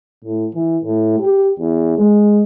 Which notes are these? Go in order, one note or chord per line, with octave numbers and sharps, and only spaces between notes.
A2
E3
A2
G4
E2
G#3